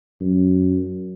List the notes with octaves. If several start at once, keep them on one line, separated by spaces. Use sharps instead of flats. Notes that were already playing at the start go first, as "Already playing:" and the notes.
F#2